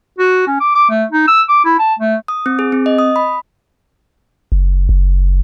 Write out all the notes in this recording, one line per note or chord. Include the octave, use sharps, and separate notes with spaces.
F#4
C#4
D6
D6
A3
D#4
E6
D6
E4
A5
A3
D#6
C4
G#4
C4
D#5
D#6
B5
F#1
F#1